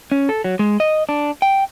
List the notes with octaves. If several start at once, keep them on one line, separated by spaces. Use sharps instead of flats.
C#4
A4
F#3
G#3
D#5
D4
G5